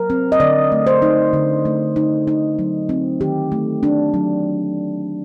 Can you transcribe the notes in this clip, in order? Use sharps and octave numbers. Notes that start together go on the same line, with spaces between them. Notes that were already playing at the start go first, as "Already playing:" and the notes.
Already playing: F#3 A#4
C4
D#5
D3 D5
A3
C5
D#4
D3
A3
D#4
D#4
F#3
C4
D#3 G4
A3
D4
F#3